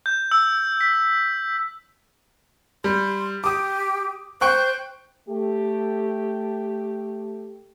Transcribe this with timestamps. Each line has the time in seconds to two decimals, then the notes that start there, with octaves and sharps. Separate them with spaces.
0.06 G6
0.32 E6
0.81 B6
2.84 G3 C6
3.44 G4 D6 D#6
4.41 C5 G5 C#6 F#6
5.28 A3 G4